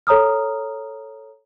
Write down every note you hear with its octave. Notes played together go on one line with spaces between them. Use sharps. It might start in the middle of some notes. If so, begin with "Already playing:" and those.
A4 C#5 A#5 D#6 F6